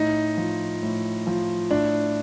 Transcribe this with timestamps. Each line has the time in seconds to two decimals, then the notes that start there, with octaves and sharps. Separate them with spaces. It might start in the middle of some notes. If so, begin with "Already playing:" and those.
Already playing: A2 D#4
0.37 F3
0.83 A2
1.27 F3
1.71 A2 D4